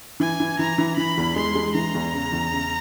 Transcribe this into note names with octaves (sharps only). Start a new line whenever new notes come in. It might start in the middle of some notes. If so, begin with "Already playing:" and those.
E3 G#5
E3
E3 A#5
E3
E3 B5
E2
G#3 C6
G#3
E3 A#5
E2
C#3
E2
C#3